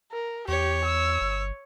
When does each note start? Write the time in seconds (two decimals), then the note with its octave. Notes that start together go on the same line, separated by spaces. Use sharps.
0.12 A#4
0.48 E2 G4 C#5
0.85 E6
1.21 G1